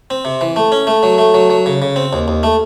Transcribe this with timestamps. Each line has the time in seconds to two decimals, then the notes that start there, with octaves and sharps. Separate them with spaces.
0.10 C4
0.25 C3
0.41 E3
0.56 A3
0.72 C#4
0.87 A3
1.03 F#3
1.18 A3
1.34 F#3
1.50 F#3
1.66 C#3
1.82 C#3
1.96 C4
2.13 D#2
2.28 D#2
2.43 A3